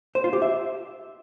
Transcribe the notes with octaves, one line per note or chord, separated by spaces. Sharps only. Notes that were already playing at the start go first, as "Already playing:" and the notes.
C5
F4
G4
E5